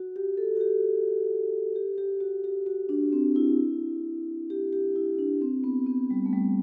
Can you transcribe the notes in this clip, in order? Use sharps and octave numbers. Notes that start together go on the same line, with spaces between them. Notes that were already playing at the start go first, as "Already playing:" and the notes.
Already playing: F#4
G4
A4
F#4
G4
G4
G4
F#4
G4
F#4
D4
C4
E4
G4
G4
E4
D4
C4
B3
B3
G3
A3
G3